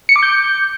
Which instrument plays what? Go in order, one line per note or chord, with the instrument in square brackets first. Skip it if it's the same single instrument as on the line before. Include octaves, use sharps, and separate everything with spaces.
[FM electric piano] C#7
D6
G6